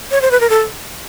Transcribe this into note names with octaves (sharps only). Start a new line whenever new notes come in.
C#5
C5
B4
A#4
A4